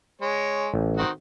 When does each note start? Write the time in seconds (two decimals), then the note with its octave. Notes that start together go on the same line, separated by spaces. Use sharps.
0.21 G#3 C#5
0.74 A1
0.97 D#3 C4 F#4